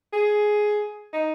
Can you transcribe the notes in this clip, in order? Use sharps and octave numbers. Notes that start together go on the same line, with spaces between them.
G#4
D#4